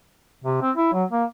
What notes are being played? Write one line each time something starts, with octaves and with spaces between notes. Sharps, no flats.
C3
C4
E4
F#3
A#3